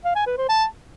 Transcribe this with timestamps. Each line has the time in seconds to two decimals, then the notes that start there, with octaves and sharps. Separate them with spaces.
0.04 F5
0.15 G#5
0.26 B4
0.38 C5
0.49 A5